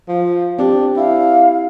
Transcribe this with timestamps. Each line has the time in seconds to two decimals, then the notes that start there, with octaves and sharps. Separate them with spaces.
0.08 F3
0.59 C4 D4 G4
0.97 E4 F5